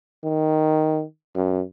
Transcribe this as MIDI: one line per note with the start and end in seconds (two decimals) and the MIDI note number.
0.24 1.02 51
1.35 1.62 42